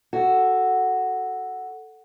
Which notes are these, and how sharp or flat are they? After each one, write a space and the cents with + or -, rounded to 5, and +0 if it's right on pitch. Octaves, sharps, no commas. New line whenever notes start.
F#4 +0 A4 +0